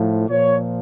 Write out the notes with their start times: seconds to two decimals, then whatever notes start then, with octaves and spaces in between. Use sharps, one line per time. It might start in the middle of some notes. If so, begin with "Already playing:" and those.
Already playing: A2 F3
0.29 A#2 F3 C#5